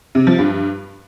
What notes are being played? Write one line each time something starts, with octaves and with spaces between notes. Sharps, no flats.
C3
F3
G2